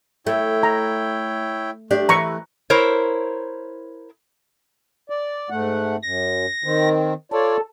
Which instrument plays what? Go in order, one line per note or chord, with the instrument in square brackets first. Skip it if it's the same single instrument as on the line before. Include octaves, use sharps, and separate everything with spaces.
[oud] A3 [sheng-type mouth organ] E4 C#5 G5
[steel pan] A#5
[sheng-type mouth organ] A3 [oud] D4 G4 D5
[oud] E3 B4 [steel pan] A#5 C#6
[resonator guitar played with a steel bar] E4 A#4 C5 C#5
[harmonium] D5
G#2 A3 F#5
[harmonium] F#2 [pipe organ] A#6
[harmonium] D#3 C4
[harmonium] F4 C#5 D5 [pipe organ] A4